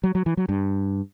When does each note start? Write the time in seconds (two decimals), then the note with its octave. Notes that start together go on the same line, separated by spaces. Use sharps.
0.04 F#3
0.15 F#3
0.26 E3
0.37 F#3
0.49 G2